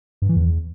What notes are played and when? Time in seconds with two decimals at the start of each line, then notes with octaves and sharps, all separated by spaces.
0.22 G2
0.29 E3
0.36 E2